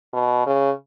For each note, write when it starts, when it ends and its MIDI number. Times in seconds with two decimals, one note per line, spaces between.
0.13 0.46 47
0.46 0.71 49